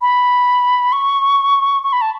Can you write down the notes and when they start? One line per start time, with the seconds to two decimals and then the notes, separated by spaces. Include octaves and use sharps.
0.01 B5
0.92 C#6
1.83 C#6
1.93 B5
2.01 A5